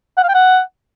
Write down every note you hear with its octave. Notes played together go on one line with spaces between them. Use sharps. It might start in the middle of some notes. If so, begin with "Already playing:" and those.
F#5
F5
G5
F#5